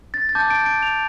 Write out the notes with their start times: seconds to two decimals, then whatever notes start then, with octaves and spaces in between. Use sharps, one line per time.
0.14 A6
0.29 A6
0.35 A5 D6 G6
0.50 D7
0.66 D7
0.82 F7